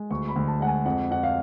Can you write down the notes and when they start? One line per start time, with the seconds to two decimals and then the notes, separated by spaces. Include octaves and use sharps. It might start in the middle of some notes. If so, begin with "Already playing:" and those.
Already playing: G#3
0.10 D2 C#6
0.29 B5
0.36 D2
0.48 A5
0.60 G#3 F#5
0.67 G#5
0.85 F2 F#5
1.11 F2 F#5
1.23 F5